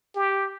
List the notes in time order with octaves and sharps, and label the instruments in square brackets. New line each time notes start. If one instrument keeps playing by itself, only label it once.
[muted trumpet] G4